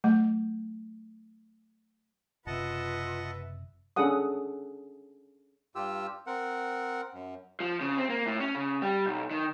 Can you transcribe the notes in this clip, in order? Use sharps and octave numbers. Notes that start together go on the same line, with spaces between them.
F#3 A3
F#1 C3 F4 B4 D#5 E5 F#5 A5
C#4 D4 G#4 A4 F#5 D#6
G2 F4 G4 E6
C4 A#4 F#5
F#2
F3
C#3
C4
A#3
A2
C#4
C#3
G3
B1
D#3